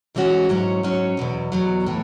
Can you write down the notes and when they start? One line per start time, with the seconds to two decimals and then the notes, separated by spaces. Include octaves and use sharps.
0.15 G#2 E3 G#3 C#4 F#4
0.49 G#2 F#3 C#4
0.83 G#2 F#3 C#4
1.17 E2 B2 F#3
1.52 E2 B2 F#3
1.86 A2 E3